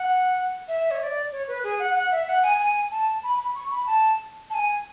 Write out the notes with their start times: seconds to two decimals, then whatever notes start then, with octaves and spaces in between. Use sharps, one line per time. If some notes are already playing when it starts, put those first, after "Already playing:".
Already playing: F#5
0.68 E5
0.91 C#5
1.00 E5
1.03 D5
1.32 C#5
1.48 B4
1.64 G#4
1.79 F#5
1.95 F#5
2.11 E5
2.27 F#5
2.43 G#5
2.59 G#5
2.91 A5
3.23 B5
3.39 B5
3.55 C#6
3.71 B5
3.86 A5
4.50 A5
4.54 G#5